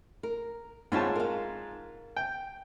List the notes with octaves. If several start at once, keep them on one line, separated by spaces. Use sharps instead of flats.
A#4
G#2 B3 C4 F4 C#5 A5
A#4 F5
G5